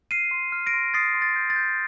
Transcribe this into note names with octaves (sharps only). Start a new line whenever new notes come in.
F6 C7 D#7
C6
F6
A#6 D7
C6
D#6 A6 C7
C6
A6
G6
A6
G6